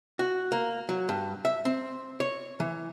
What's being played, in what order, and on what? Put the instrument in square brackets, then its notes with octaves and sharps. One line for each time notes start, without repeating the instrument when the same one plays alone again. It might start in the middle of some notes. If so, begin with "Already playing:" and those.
[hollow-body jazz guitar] F#4
A#3
F#3
G2
E5
C4
C#5
E3